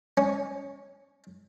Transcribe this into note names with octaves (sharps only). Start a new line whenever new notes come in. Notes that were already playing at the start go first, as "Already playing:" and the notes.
C#4